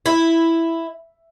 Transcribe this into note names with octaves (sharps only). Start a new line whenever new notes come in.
E4